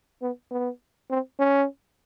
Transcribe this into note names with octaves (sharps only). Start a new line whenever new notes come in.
B3
B3
C4
C#4